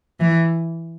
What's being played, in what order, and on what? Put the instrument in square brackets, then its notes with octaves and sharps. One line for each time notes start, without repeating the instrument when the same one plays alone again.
[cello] E3